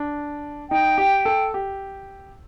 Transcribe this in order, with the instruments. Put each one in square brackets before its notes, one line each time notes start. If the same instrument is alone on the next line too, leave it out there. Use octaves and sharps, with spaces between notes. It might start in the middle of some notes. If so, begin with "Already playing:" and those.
Already playing: [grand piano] D4
[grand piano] D#4 [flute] G5
[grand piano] G4
A4
G4